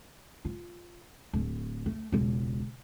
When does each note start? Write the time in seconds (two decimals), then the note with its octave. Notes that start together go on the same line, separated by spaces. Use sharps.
0.45 F4
1.33 D1
1.86 A3
2.12 E1 C#2